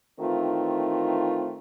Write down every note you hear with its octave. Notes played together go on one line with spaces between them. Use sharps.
D#3 E3 A3 C4 D#4 F4